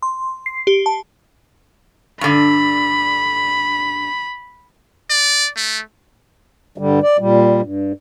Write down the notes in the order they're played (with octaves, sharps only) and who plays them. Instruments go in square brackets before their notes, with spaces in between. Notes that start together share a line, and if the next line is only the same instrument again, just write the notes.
[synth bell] C6
C7
G4
A5
[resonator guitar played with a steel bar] G2 D3 [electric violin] B5
[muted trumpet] D5
A3
[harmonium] G2 D3 G3
D5
A#2 G3
G2